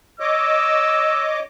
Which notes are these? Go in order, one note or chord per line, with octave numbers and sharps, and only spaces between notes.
C#5 D#5 D6 E6